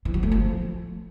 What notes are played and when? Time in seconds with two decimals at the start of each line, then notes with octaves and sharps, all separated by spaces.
0.05 E3
0.14 F#3
0.23 A3
0.32 F3